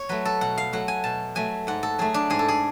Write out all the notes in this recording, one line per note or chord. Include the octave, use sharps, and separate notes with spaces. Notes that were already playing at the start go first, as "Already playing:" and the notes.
Already playing: C#5
F#3 A3 B4
A4
B2 F#5
F5
F#3 A3 F#5
G#5
B2 A5
F#3 A3 G#5
G#2 F#5
A4
F#3 A3 G#4
D4
G#2 G#4
A4
G#4